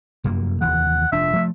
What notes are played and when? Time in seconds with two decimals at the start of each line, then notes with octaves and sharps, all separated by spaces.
0.24 F1 F#2 A#3
0.61 F1 D#2 E3 F#5
1.12 F1 F3 D4 E5
1.33 F3 A3